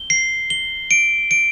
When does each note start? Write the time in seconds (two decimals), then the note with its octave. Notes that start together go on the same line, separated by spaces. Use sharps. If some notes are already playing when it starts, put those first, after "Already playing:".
Already playing: G7
0.10 C7
0.50 G7
0.91 D7
1.31 D7